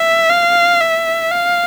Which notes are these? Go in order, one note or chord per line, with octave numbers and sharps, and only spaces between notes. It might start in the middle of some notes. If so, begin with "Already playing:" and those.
Already playing: E5
F5
E5
F5